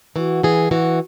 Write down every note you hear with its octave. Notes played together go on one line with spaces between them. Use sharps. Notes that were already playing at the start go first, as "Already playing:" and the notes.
E3 F#4
E3 G#4
E3 F#4